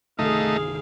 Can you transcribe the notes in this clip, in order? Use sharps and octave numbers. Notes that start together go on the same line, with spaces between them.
G1 C2 D#3 A3 D#4 G#4 F5